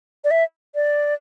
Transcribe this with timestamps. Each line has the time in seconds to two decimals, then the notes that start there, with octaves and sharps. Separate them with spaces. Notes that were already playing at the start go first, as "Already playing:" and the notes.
0.24 D5
0.31 E5
0.75 D5